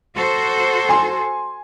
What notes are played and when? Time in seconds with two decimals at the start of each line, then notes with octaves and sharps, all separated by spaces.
0.16 F#4 A4 C5
0.89 G#5 C6